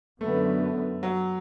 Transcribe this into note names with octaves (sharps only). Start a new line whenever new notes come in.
F#2 D3 A3 B3
F#3